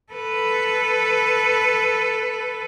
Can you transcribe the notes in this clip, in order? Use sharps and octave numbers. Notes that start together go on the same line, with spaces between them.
A4 B4